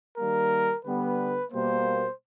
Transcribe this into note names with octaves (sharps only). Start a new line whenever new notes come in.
D#3 G3 A#3 A#4
D3 G3 B3 B4
B2 G3 A#3 C5